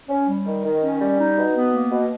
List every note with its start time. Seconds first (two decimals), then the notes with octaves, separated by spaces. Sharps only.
0.08 C#4
0.27 G3
0.45 D#3
0.64 D#3
0.81 C#4
1.00 G3
1.18 D#4
1.37 B2
1.55 B3
1.72 A#3
1.91 B2